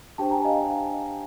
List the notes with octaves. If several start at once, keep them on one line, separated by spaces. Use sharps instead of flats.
D4 G4 C5 G5 A5
G#5 A#5
D#5 F5